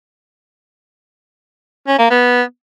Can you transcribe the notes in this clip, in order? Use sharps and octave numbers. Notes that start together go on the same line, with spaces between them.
C#4
A#3
B3